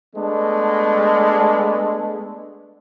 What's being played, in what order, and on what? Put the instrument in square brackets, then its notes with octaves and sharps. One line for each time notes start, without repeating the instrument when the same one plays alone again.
[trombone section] G#3 A3 B3 D4